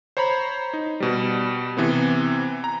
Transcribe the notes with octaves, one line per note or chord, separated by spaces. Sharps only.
C5 C#5 A#5 B5
D#4
B2 G3
C3 E3 B3 C4
A#5